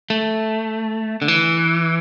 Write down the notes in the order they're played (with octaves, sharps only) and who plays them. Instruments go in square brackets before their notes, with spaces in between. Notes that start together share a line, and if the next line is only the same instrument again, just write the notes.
[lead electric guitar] A3
D3
E3